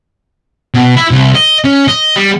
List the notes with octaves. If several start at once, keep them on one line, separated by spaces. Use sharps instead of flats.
B2
E4
C2
D#5
C#4
D#5
G3